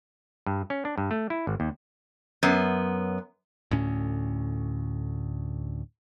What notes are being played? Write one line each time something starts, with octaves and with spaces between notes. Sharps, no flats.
G2
C#4
D4
G2
A3
E4
G#1
D#2
F#2 B3
D2 A2 C#4